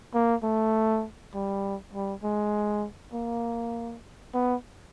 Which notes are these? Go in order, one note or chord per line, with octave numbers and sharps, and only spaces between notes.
A#3
A3
G3
G3
G#3
A#3
B3